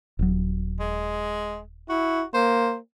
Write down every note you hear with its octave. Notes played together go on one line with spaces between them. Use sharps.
D#1 F#3
G#3
E4 F#4
A#3 C5